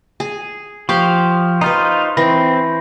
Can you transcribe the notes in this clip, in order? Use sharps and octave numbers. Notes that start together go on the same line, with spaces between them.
G#4
F3 G4 F5 C6 C#6 G6
D#4 F4 B4 C5
E3 C4 B5 A#6